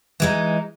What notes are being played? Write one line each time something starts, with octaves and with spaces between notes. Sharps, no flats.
E3 G#3 D#4